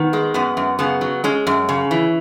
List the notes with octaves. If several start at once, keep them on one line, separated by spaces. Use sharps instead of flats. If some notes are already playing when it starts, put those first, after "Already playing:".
Already playing: D#3 B3
G#3
F#2 B3
F#2
C#3 B3
F#3
G#3 C#4
F#2
C#3
E3